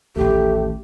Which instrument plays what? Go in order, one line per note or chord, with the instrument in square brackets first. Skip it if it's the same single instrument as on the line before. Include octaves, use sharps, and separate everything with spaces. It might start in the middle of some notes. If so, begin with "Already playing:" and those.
[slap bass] A1 D#2 [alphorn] A3 [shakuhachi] G4